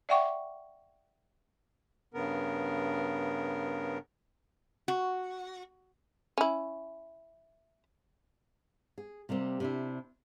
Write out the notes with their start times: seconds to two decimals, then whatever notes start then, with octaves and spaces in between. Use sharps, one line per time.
0.09 D5 E5 F#5 G5 C#6 D6
2.14 G2 C#3 B3 A#4
4.88 F#4
6.38 C#4 E4
8.98 G#4
9.29 C3 G3 A#3 C4
9.60 C3 D4 E4